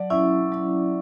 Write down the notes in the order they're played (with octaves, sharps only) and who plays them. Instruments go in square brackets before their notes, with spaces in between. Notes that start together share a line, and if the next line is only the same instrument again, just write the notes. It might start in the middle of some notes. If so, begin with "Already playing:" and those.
Already playing: [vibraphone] F#3 [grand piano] D5
[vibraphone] C#4 E4 [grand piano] E5
[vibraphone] F#3